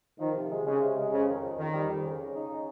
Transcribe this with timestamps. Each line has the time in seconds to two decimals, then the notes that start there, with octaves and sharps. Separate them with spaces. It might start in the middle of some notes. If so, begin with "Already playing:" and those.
0.20 D#3 F3
0.34 C3
0.51 G#3
0.65 C#3 G#3
0.81 C3
0.97 G#3
1.11 F2 C#3
1.28 D#3
1.42 F2
1.58 F2 D#3
1.73 G3
1.88 F2
2.04 C#3
2.19 C#3
2.34 D#4
2.49 C#3